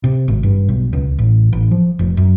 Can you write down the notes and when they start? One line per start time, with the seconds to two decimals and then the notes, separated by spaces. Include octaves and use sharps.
0.04 C3
0.28 G#1
0.43 G2
0.68 B1
0.93 C#2
1.19 A1
1.52 A1
1.71 F3
1.99 F1
2.17 F#2